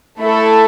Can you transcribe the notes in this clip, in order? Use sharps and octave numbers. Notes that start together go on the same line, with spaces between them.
A3 E4 A4